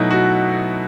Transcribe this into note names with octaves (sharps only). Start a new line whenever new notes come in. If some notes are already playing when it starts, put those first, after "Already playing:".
Already playing: B2 F#3 A3 D#4 E4
F#4